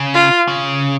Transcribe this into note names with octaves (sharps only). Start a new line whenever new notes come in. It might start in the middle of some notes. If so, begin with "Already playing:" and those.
Already playing: C#3
F4
C#3